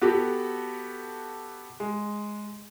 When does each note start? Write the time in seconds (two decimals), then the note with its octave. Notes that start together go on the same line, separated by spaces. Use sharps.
0.02 B3 F#4 G4 A4
1.80 G#3